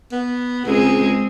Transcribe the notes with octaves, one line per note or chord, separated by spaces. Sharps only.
B3
C#2 G#3 C4 G#4